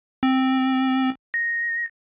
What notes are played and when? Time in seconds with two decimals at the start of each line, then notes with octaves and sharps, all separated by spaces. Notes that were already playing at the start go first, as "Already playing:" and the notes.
0.23 C4
1.34 A#6